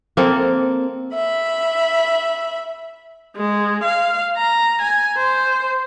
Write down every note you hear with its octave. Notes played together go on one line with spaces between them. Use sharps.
A#3 C4 A4
E5 B5
G#3
F5
A#5
G#5
C5